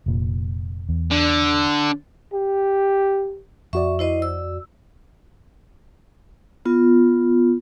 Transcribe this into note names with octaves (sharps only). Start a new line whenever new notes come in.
F1 A#2
E2
D3
G4
F2 F#4 D5 E5 C#6
E4 C5 D#5
E6
B3 F4